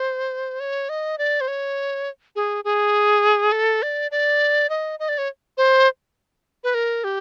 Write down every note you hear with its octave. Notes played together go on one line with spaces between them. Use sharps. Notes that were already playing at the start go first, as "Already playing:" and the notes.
Already playing: C5
C#5
D#5
D5
C5
C#5
G#4
G#4
A4
D5
D5
D#5
D#5
D5
C#5
C5
B4
A#4
G4